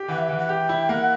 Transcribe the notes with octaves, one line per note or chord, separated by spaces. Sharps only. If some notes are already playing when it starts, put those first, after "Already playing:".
Already playing: G4
E3 F#5
E5
E3 F#5
F#5
G4 G5
E4
A#3 F#5